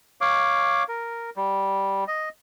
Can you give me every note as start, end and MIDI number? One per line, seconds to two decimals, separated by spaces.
0.21 0.83 73
0.21 0.83 77
0.21 0.83 86
0.88 1.30 70
1.37 2.04 55
2.08 2.29 75